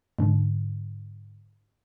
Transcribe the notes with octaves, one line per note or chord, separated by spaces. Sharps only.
G#2 D3